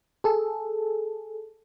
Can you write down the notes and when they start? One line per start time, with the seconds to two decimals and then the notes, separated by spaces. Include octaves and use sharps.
0.24 G#4 A4